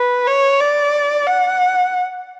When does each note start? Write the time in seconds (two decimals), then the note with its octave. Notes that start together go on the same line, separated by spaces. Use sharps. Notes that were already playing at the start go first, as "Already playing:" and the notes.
Already playing: B4
0.27 C#5
0.61 D5
1.27 F#5